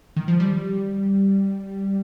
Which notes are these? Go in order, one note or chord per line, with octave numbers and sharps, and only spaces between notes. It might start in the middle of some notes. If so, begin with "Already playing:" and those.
D#3
F3
G3